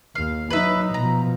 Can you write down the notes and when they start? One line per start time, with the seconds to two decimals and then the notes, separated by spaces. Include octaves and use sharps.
0.15 D#2 F5
0.50 F#3 D#4 B4 E5
0.94 B2 F3 A#5